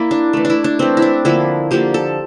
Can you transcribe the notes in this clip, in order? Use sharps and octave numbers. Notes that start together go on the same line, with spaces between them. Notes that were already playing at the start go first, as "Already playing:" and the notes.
Already playing: A#3 E4 D5
D4
E3 A3
D4 E4
D4
E3 A3 C4
E4
D4
D3 F3 A#3 E4
D3 F3 A#3 G4
A4